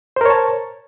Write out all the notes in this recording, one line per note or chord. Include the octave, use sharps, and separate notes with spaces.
A#4 C5 C#5 A5